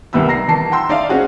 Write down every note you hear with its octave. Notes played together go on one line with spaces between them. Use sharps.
C2 D#3 G3 B3 E5 E6
A#5 A#6 C7
D#3 E3 A5 C7
F#5 G5 A#5 C6 E6
D#4 D5 E5 F5
C4 C#4 F#4 G#4